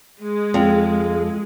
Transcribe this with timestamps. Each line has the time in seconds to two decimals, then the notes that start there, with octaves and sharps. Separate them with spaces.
0.20 G#3
0.54 F2